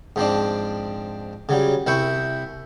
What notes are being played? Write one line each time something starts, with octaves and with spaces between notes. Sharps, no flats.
G#2 F3 C4 D4
C#3 F#3 G3
C2 E4 E5 G5 C#6